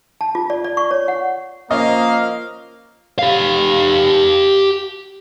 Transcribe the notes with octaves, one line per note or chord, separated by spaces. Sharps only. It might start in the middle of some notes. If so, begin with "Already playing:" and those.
A5
F4
D5
D5
C#6
C#5
F#5
F3 A#3 C#4 D#5 F5
G4 F5